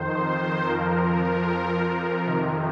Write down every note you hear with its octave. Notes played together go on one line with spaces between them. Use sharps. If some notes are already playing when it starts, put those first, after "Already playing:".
Already playing: F2 D#3 C5
F2 F3 A#4
F2 F3
F2 C3 D#3